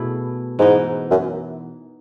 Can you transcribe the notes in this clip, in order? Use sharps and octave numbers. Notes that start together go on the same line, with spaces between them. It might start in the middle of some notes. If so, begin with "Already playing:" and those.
Already playing: B2 A3 E4 G#4
G#2 E3 B3 D#4
F#2